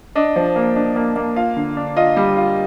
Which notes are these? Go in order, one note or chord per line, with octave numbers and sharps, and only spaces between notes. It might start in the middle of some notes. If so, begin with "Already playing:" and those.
D4 D#5
F3
A#3
D4
A#3
A#3
F4 F5
D3
D4
F4 D#5
G3
F4